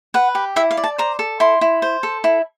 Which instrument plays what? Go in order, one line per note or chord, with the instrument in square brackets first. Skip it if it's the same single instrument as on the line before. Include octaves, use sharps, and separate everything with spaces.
[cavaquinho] B4 F#5
G4
E4 E5
F5
D5
A5
C5 A#5
A4
E4 C6
E4
C5
A4
E4